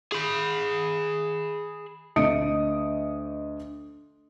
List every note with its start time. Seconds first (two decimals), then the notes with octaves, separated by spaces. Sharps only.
0.12 G#4 B5
2.16 D2 D#5 D#6 C#7 D7